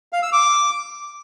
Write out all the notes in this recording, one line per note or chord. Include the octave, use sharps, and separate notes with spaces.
F5
E6
D6